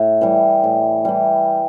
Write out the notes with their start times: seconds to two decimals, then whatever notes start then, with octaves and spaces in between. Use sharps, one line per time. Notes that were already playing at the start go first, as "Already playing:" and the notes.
Already playing: A2
0.21 E3 G3
0.64 A2
1.05 E3 G3